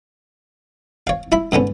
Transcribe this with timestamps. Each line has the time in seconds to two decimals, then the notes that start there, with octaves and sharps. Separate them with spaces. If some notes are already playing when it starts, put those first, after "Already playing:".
1.07 C#5 F5
1.32 E4 E5 B5
1.52 G#2 D3 B3 C#4